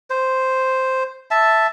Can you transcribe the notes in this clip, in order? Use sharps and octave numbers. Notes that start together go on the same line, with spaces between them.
C5
E5 A5